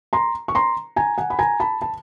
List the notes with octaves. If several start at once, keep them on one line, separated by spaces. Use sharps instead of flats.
A#5 C6
C#6
A#5 C6
G#5 A#5
F#5 G#5
B5
G#5 A#5
A5 B5
A5